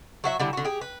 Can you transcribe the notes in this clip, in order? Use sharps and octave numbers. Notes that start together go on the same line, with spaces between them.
F#3 F#4 E5
D3 G3 E4
D3 F#4
G4 G#4
B4